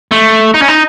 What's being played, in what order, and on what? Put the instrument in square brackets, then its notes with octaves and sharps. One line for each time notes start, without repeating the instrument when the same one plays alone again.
[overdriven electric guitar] A3
D#4
C#4
D#4